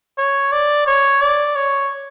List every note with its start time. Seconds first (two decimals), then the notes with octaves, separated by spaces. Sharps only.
0.18 C#5
0.53 D5
0.87 C#5
1.21 D5
1.56 C#5